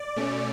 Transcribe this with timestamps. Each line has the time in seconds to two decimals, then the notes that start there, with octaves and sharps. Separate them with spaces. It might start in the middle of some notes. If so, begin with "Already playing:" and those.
Already playing: D5
0.16 B2 A3 C#4